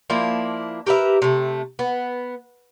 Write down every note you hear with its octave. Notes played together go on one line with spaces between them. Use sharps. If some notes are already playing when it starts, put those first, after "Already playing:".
F3 A#3 D4 E4
G4 A#4 B4 E5
C3 A3
B3